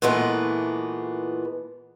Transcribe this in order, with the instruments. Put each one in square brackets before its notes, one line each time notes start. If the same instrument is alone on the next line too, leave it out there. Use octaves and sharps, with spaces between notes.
[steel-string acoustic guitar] A#2 E3 G#3 A3 B3